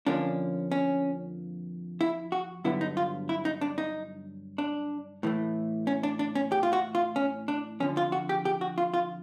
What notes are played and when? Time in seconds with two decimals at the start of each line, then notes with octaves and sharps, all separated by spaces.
0.06 F2 D3 F3 A#3 C#4 D4
0.71 C#4
2.01 E4
2.32 F#4
2.64 G2 D3 F#3 B3 E4
2.81 D#4
2.97 F4
3.29 E4
3.45 D#4
3.61 D4
3.78 D#4
4.58 D4
5.23 A2 E3 A3
5.87 C#4
6.03 D4
6.19 D4
6.35 C#4
6.52 G4
6.63 F4
6.73 F#4
6.95 F4
7.16 C#4
7.48 D4
7.80 F2 D3 F3 C#4
7.97 F4
8.12 F#4
8.29 G4
8.45 G4
8.61 F#4
8.78 F4
8.94 F4